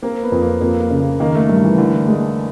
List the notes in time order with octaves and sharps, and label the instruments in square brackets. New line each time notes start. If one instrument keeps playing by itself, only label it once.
[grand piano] A#3 [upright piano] C4
[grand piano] B3
[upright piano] F2
[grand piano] A#3
[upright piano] F2 [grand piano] A#3
[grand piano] A#3
[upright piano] C#3
[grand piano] A#3
[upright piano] D#3 [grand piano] A#3
[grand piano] A3
[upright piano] G2 [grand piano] A#3
[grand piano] E3
[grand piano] D3 [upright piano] E3
[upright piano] G#3